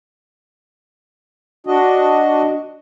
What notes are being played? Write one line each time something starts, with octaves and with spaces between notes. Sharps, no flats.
D4 F#4 D#5